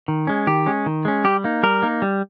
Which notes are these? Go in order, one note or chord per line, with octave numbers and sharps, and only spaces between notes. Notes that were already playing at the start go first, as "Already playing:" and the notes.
D#3
G#3 C#4
D#3 G4
G#3 C#4
D#3
G#3 C#4
G3 G4
A#3 D#4
G3 A#4
A#3 D#4
G3